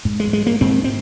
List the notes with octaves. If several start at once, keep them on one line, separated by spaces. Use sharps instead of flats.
G#2
G#3
G#3
A#3
G#2 C4
C4